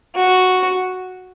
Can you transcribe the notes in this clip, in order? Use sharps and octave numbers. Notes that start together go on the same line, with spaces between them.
F#4